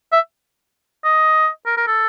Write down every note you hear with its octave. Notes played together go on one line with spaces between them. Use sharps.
E5
D#5
A#4
A#4
A4